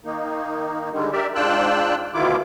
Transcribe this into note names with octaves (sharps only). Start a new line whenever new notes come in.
D#3 A#3 D#4
D3 D#3 G3 G#3
G4 A#4 D5 E5
G#2 D4 F4 G5 E6 F#6
D2 B2 D#3 E4 F4 D6